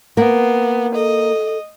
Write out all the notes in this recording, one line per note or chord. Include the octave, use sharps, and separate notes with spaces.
A#3 B3
A4 D#5